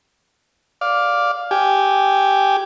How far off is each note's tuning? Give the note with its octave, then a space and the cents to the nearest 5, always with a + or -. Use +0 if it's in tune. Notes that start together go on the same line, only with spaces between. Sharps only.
D5 +0 F5 +10
G4 -5 G#5 +0